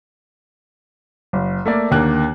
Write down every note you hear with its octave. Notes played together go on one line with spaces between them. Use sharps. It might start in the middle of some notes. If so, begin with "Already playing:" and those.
F#1
A3 A#3 D5
D#2 D3 A#3 F#6